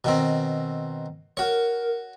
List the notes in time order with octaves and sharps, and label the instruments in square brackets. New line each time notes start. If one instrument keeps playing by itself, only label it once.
[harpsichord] B2 D#3 C4
[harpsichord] F#4 C#5 [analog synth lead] A#4